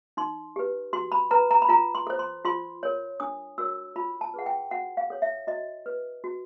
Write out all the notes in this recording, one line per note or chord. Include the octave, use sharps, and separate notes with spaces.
D#4 C6
G4 B4
F#4 C6
B5
B4 A#5
A#5
B5
F4 A#5
C6
A4 C5
C6
F4 C6
A#4 C#5
D4 D#6
F#4 A#4 C#5 E6
F4 B5
A5
G#4 B4 F#5
G5
F#4 F#5
F5
A4 C#5
E5
F#4 D#5
B4
F#4